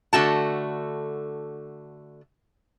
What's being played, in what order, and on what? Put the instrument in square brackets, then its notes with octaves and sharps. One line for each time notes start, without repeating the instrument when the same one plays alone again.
[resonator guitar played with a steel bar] D3 A3 F#4 A5